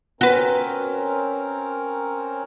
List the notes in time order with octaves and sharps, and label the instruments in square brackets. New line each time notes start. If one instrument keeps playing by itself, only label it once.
[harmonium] C4 C#4 A#4 [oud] F#4 B4